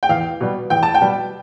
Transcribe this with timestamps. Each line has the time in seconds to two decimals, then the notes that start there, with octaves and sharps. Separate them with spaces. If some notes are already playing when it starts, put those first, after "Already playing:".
0.03 G5
0.09 E2 F5
0.40 B2 G3
0.70 E2 G5
0.83 A5
0.94 G5
1.01 B2 G3